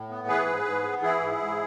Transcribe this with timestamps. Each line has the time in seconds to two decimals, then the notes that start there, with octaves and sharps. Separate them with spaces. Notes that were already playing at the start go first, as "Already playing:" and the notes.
Already playing: A2
0.09 B3
0.27 E3 G#4 B4
0.46 G#2
0.65 G#2
0.83 B3
1.02 E3 E4 G#4
1.20 G#2
1.38 G#2